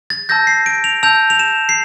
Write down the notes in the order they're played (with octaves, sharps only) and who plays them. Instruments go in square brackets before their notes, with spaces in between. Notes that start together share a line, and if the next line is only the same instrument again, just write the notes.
[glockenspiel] A6
A5 E6 G6 A#6
C7
D7
F7
A5 E6 G6 F7
F7
E7
C7